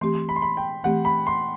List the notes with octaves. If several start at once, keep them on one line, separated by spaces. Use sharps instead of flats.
E3 A3 C4 G4 C6
B5
C6
B5
G5
E3 A3 C4 G4 F#5
B5
C6